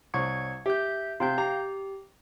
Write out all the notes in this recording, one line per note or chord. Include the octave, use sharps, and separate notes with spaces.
C2 C#5 C#6 G#6 C#7
G4 E5 G6
C3 F5 G5 G6
G4 A#5